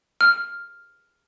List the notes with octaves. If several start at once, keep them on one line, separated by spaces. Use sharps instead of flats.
F6